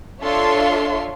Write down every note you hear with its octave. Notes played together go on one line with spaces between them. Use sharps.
D4 F4 A4 C#5 E5 C6